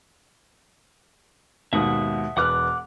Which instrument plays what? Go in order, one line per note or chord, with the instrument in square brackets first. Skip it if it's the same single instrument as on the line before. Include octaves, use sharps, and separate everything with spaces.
[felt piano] D#2 G#2 B2 [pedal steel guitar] E5 F#5 D#6
[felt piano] E1 B4 F6 [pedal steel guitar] F#5 D6 F#6